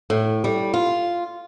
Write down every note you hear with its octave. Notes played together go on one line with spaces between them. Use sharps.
A2
G3
F4